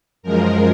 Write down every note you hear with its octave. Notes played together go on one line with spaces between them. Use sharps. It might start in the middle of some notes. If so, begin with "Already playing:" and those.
F#2 F3 G#3 A#4